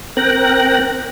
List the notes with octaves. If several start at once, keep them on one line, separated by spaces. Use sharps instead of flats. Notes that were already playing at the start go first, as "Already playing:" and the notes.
C4 A#4 G5 F#6 A#6